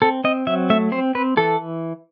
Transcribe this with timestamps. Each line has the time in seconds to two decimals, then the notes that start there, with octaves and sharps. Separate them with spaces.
0.02 C4 A4
0.24 C4 D#5
0.47 F#3 E5
0.70 A3 E5
0.92 C4 C5
1.15 C4 B4
1.37 E3 A4